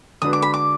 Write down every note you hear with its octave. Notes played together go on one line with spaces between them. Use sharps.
D3 G#3 D4 F#4 B4 D#6
D6
B5
D6